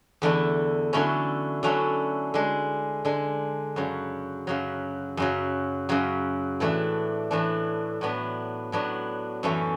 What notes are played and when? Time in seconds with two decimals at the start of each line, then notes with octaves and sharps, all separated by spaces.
0.22 E2 D3 A3 E4
0.93 D3 F#3 A3 C#4 E4
1.63 D3 F#3 A3 C#4 E4
2.34 D3 G#3 D4
3.05 D3 G#3 D4
3.76 F#2 C#3 F#3
4.47 F#2 C#3 F#3
5.17 F#2 C#3 F#3
5.89 F#2 C#3 F#3
6.60 A2 E3 A3 D4
7.31 A2 E3 A3 D4
8.01 A2 F#3 B3 D4
8.72 A2 F#3 B3 D4
9.43 F#2 E3 A3 C#4